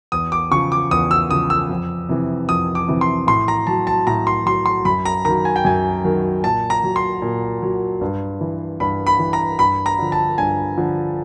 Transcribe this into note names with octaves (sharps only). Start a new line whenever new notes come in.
E2 D#6
D6
C#3 F3 C#6
D6
E2 D#6
E6
C#3 F3 D#6
E6
F2
C3 E3
F2 D#6
D6
C3 E3
C6
A2 C6
A#5
F#3 A5
A5
A2 A#5
C6
F#3 C6
C6
F#2 B5
A#5
D#3 F#3 A#5
G#5
G5
F#2 G#5
D#3 F#3
A#2 A5
A#5
F#3
C6
A#2
F#3
G2
E3
G2 B5
B5
E3
A#5
G2 B5
A#5
D3 F3
A5
G2 G#5
D3 F3